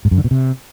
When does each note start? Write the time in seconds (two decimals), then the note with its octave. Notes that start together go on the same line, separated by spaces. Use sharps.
0.05 G#2
0.11 F#2
0.18 D3
0.24 B2
0.31 C3